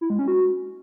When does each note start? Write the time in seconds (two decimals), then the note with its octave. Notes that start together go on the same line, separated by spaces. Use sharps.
0.01 E4
0.10 G#3
0.19 C#4
0.28 F#4